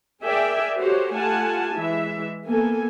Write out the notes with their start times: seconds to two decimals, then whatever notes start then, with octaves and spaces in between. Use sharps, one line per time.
0.22 G#4 A#4 D5 E5 G5 G#5
0.78 F#4 G4 A4 C5 C#5
1.15 A3 F4 G4 F#5 G#5 A5
1.75 E3 G#3 E5
2.47 A#3 B3 A4 G#5